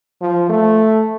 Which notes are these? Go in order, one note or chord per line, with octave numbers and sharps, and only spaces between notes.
F3
A3